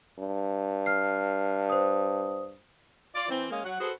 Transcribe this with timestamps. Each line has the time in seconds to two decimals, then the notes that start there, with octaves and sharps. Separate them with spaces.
0.19 G2
0.86 F6 C7
1.69 C5 D#6
3.14 F4 D5
3.28 E3 C4
3.50 G#3 A#3 C#4 D#5 F5
3.64 F#3 F#5
3.79 F#4 G#4 A4 B4 C5